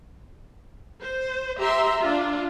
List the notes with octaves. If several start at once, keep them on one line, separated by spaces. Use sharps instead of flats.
C5
G4 E5 A#5 C6
D4 F4